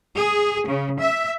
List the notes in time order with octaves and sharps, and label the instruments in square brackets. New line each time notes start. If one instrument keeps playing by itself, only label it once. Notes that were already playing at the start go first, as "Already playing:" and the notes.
[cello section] G#4
C#3
E5